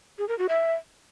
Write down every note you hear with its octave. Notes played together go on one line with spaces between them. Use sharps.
G#4
A#4
F#4
E5